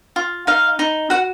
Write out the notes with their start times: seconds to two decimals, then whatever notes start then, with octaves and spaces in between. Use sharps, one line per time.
0.16 F4
0.47 D#4 F5
0.79 D#4
1.10 F#4 F#5